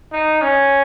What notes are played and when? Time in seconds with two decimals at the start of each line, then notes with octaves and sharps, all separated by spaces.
0.13 D#4
0.42 C#4